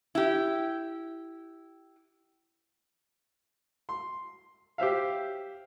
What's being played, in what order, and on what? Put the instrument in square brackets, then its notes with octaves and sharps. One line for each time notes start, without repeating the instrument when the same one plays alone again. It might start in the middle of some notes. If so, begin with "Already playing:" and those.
[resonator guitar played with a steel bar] E4 G4
[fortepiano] C6
G4 C5 E5 F5